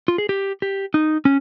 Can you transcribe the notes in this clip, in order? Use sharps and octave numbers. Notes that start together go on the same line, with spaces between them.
F4
G#4
G4
G4
D#4
C#4